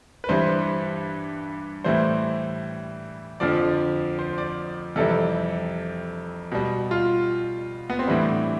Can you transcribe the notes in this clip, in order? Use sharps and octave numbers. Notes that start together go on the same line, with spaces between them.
B4
G2 E3 G3 C5
A2 E3 G3 C5
F2 D3 F3 D5
C5
D5
F2 C3 E3 G3 A4
B2 G3
F4
B3
C4
A2 E3 G3 D4